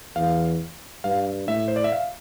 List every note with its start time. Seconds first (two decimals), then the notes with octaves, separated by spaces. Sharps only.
0.15 E2 F5
1.04 G2 F5
1.48 A2 E5
1.68 C5
1.76 D5
1.84 E5
1.92 F5